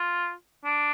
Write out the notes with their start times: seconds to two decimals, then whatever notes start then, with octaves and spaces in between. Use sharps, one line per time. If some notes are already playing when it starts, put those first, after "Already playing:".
Already playing: F4
0.65 D4